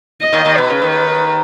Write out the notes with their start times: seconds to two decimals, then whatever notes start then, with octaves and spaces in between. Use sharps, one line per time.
0.21 D#5
0.33 D#2 D#3
0.45 D#2 D#3
0.57 B2 B4
0.70 C#3
0.82 D#2 D#3